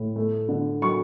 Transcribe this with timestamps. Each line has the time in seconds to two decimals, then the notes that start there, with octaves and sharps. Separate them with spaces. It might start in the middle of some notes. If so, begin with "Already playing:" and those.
Already playing: A2
0.16 A3
0.49 D3
0.82 F#3 C#6